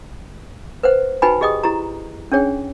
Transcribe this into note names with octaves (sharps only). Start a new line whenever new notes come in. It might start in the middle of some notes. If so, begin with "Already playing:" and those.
B4 C5 F#5
D#4 F#4 B4 G5 G#5 B5
G4 G#4 D#5 G5 D#6
E4 G4 A#5
C#4 D4 G#4 C#5 G5